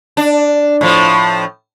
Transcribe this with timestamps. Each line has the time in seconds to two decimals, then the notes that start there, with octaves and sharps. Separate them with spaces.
0.17 D4
0.81 A2 F3